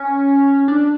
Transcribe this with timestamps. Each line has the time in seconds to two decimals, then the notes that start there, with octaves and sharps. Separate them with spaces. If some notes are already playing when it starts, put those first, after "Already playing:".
Already playing: C#4
0.68 D4